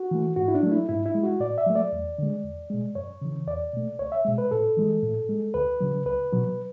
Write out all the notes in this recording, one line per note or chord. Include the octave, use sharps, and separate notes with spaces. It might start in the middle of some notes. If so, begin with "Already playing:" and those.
Already playing: F#4
E3 A3
G#2 F#4
E4
D4
F#3 A3
E4
G#2 E4
E4
G#3
F#4
A2 D5
E5
F#3 A3
D5
E2
D3 G#3
E2
B2 G#3
F#2 C#5
C#3 E3
E2 D5
B2 A3
C#2 C#5
E5
B2 G#3
B4
A2 A4
E3 G#3
A2
G#3
D2 B4
C#3 F#3
C#2 B4
B2 F#3